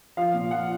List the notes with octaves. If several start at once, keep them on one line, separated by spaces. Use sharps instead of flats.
F3 F5
A#2
F3 F#5